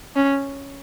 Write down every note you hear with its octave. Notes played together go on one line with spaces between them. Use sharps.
C#4